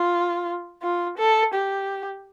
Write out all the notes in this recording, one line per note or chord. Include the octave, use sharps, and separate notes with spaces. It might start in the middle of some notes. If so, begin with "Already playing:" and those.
Already playing: F4
F4
A4
G4